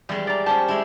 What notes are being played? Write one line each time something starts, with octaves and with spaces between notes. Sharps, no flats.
E2 G3 G#3
D5 A#5
C#4 G4 C5 A5
G#3 E4